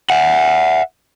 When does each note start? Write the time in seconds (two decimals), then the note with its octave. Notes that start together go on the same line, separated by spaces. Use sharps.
0.10 E5 F#5